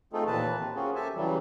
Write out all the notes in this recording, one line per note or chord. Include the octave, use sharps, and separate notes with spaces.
A3 C4 D#4 F4 G#4 A4
D#2 A#2 E3 B4 A5
C4
A#3 C4 C#4 F4 F#4 G#4
G4 A4 E5 G#5 A5
C#3 E3 F#3 G3